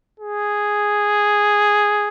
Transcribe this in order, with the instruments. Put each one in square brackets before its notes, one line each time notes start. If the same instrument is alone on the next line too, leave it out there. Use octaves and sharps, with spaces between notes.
[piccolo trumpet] G#4